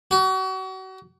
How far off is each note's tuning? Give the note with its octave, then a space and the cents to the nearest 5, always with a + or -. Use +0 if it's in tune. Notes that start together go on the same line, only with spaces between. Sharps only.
F#4 +35